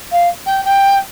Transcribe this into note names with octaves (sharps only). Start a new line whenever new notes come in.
F5
G5
G5